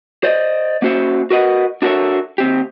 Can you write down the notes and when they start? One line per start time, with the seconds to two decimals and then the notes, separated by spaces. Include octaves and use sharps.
0.24 C5 D5 D#5
0.82 A#3 C#4 F#4 C5 E5 F5
1.30 F#4 A#4 B4 D#5 F#5
1.82 D4 F#4 A4 A#4 C#5 E5
2.38 D#2 C4 G4